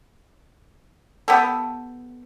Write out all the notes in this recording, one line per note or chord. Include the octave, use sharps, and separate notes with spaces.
B3 G4 A4